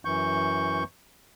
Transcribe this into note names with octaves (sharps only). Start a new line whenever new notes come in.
F#2 E3 C#6 G6